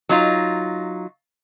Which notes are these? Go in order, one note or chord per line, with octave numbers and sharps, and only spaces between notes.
F#3 D#4 F4